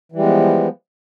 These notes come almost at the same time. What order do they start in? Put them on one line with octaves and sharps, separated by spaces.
E3 G3 G#3 B3 F3